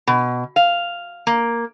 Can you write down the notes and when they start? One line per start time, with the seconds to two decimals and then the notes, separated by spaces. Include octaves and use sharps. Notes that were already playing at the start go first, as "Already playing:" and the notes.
0.07 B2
0.56 F5
1.27 A#3